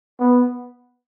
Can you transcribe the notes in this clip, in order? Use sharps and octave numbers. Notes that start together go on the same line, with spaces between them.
B3